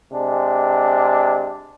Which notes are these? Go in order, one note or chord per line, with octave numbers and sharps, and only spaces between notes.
C3 G#3 D4